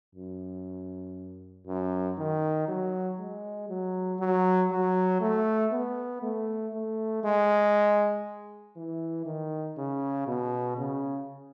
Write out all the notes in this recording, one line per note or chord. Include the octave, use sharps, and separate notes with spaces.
F#2
F#2
D#3
F#3
G#3
F#3
F#3
F#3
A3
B3
A3
A3
G#3
E3
D#3
C#3
B2
C#3